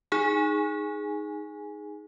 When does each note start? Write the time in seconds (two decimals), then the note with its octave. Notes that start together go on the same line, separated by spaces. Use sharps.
0.12 D#4 G#4 G#5